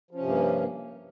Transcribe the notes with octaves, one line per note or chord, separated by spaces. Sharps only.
G2 C3 F3 A#3 C#4